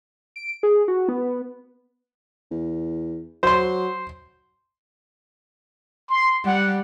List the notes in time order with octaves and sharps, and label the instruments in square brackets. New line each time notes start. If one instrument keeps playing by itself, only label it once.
[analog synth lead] D7
G#4
F#4
B3
[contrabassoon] E2
[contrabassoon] F#3 [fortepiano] C5 C6
[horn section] C6
[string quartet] G3 [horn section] F#5